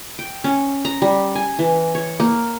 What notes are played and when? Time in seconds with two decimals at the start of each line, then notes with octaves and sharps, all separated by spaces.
0.19 G5
0.44 C#4
0.85 A#5
1.02 G3
1.35 G#5
1.59 E3
1.95 C#5
2.20 A#3